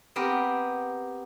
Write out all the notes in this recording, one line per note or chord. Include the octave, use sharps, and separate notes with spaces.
B3 C4 G4 A#4